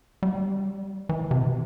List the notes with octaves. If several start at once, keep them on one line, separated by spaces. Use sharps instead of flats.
G3
E3
D#3
C3
B2